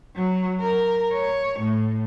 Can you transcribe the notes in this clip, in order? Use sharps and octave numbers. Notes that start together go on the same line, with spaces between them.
F#3
A#4
C#5
A2